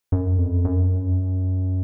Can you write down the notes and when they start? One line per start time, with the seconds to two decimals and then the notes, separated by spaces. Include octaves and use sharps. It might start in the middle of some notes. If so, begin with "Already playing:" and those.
0.12 F#2
0.38 F2
0.65 F#2